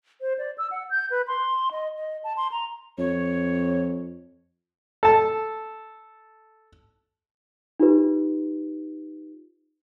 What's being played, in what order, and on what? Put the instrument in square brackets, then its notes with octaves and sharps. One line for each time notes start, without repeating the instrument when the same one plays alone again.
[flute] C5
D5
E6
F#5
G6
B4
C6
D#5
D#5
A5
C6
A#5
[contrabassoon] F2 [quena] C#5
[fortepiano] A4 A5
[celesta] D#4 F4 G4 B4